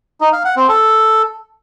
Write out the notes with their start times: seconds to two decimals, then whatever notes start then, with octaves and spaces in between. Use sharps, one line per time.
0.21 D#4
0.33 F5
0.45 F#5
0.57 C4
0.69 A4